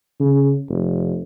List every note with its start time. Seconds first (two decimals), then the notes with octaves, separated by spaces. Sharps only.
0.20 C#3
0.69 F1